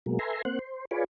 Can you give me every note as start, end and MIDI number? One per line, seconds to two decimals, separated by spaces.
0.06 0.19 47
0.06 0.19 54
0.06 0.19 56
0.06 0.19 58
0.19 0.42 69
0.19 0.42 71
0.19 0.42 76
0.19 0.42 80
0.19 0.42 82
0.19 0.42 84
0.45 0.59 58
0.45 0.59 60
0.45 0.59 72
0.45 0.59 78
0.59 0.85 72
0.91 1.04 65
0.91 1.04 68
0.91 1.04 71
0.91 1.04 73
0.91 1.04 74